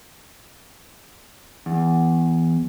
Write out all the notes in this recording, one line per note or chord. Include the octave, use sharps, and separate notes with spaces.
E2